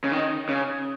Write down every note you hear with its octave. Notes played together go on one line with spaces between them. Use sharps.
C#3
D#3
C#3